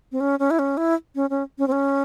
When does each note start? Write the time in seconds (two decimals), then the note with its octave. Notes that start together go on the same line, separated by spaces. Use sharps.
0.12 C4
0.20 C#4
0.39 C#4
0.51 E4
0.59 C#4
0.77 E4
1.15 C#4
1.30 C#4
1.58 C#4
1.68 C4
1.72 C#4